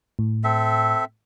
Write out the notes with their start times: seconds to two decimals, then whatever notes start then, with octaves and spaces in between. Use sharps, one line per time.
0.19 A2
0.44 C4 A4 E5